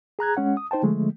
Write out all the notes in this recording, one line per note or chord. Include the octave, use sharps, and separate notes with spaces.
G#4 A#5 F#6 G#6
G#3 C#4 F#5
D#6
D#4 C5 G5 A5
D3 F3 G#3 A3